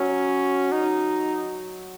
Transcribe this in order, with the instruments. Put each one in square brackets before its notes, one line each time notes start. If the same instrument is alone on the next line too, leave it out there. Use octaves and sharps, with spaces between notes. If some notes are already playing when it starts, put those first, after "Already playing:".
Already playing: [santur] F#3 [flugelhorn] C#4
[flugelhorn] D#4